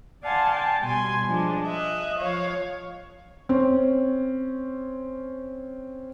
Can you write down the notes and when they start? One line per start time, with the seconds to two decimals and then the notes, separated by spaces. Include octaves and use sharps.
0.23 D5 F5 F#5 G#5 A5 C6
0.52 G5 A5
0.83 B2 G3 G#5 C6
1.26 F3 G#3 D4
1.64 D#5 E5 F#6
2.20 F3 C#5 F5
3.49 C4 C#4